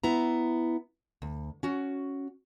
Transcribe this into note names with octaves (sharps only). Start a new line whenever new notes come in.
B3 E4 A#5
D2
C#4 F#4